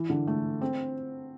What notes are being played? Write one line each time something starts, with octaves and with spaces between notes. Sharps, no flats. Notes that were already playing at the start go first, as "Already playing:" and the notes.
Already playing: E3
D3
A3
C4